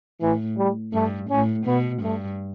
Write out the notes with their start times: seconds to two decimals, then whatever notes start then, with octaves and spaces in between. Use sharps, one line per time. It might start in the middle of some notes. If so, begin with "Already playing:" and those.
0.21 A2 E3
0.58 G3
0.94 G2 A3
1.30 A2 C#4
1.66 B2 B3
2.02 G2 A3